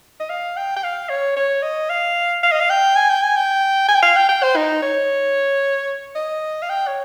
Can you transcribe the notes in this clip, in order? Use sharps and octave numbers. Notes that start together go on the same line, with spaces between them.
D#5
F5
G5
G5
F5
C#5
C#5
D#5
F5
F5
D#5
F5
G5
G#5
G5
G#5
G5
G#5
G5
F5
G5
G5
C5
D#4
C#5
D#5
F5
G5
C#5